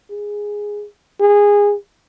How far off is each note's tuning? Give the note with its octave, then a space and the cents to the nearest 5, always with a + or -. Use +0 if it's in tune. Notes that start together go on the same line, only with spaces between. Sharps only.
G#4 -5
G#4 -20